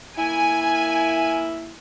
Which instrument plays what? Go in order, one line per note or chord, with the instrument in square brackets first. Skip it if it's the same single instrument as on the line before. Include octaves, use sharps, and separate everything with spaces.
[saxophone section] A#3 E4 [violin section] G#5